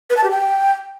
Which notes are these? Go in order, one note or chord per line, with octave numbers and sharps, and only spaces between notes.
B4
A5
G4
G5